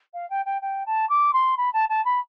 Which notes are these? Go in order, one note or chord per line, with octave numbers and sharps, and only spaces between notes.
F5
G5
G5
G5
A5
D6
C6
B5
A5
A5
B5